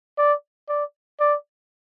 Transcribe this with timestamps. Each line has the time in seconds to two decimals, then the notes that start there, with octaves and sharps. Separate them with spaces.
0.18 D5
0.69 D5
1.20 D5